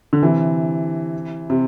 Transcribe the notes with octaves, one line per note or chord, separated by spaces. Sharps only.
D3
C3 E3
C3